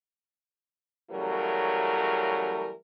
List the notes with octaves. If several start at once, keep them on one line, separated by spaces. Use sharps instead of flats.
C#3 E3 F#3 G3 A3 A#4